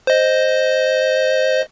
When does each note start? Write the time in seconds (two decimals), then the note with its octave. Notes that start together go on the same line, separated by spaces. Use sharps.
0.07 C5 D#5